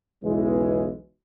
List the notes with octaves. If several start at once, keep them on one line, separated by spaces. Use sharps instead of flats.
B1 E2 C#3 E3 G#3